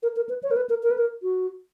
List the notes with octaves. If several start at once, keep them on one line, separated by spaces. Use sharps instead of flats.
A#4
A#4
B4
C#5
A#4
B4
A#4
A#4
B4
A#4
F#4